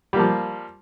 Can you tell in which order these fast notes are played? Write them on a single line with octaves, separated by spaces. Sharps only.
G3 A#3 F3